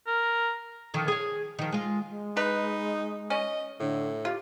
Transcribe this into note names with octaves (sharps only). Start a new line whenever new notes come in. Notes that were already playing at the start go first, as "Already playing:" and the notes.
A#4
D3 D#3 F3
G#4 C#5
D#3 F3
G#3 F4
G#3
D#4 B4
C#4 D#5
A2 D3
F4 G4